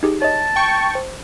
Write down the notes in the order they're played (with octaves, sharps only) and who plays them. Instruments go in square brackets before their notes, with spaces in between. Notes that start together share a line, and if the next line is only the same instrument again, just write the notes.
[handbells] D#4 G4 G#4
[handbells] C#5 D#5 [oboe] A5
[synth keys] G5 C#6
[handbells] C5